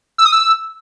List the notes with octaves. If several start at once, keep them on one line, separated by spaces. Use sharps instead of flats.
E6
D#6
E6